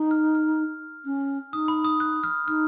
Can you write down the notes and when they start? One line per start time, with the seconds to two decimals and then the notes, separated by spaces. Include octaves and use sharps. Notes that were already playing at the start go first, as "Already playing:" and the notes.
Already playing: D#4
0.11 F6
0.35 F6
1.05 C#4
1.53 D#4 D#6
1.68 B5
1.85 D#6
2.00 F#6
2.24 F6
2.48 D#4 F6